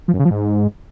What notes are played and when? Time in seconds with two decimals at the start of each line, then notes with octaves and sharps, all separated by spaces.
0.08 F3
0.14 F#2
0.20 C#3
0.25 F3
0.31 G#2